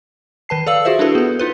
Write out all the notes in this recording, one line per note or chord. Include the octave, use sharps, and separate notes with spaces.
D#3 B4 A5 C7
A4 D5 F5 E6 F#7
F4 F#4 G#4 C5 E5
D4 E4 F#4 G#4 A4 B4
B3 A4
D#4 F4 B4